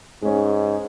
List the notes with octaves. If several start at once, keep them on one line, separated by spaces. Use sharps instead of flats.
G#2 G#3 C#4